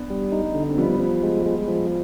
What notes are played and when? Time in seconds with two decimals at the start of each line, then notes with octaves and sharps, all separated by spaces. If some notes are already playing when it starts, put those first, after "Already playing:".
Already playing: B3 D4
0.10 G3
0.32 D#4
0.55 D3
0.69 C4
0.77 F3 G3 B3
1.00 F3
1.23 G#3
1.46 G#3
1.68 F3